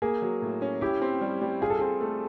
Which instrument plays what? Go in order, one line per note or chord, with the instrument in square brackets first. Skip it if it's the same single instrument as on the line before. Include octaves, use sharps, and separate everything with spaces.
[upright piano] A#3 [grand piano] G#4
[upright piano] F#3
A2
C#4
[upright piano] E4 [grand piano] G4
[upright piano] C4
G3
G3
[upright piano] F4 [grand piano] G#4
[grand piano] A4
[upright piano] C4 [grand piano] G#4
[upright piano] A3